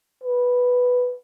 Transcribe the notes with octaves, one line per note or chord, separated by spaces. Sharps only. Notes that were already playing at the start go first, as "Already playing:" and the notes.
B4